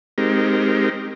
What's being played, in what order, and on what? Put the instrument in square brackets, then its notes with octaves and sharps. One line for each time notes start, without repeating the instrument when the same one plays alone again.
[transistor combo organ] G#3 C4 D#4 G4 A#4